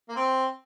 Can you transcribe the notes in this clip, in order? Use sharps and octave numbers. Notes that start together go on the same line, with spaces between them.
A#3
C4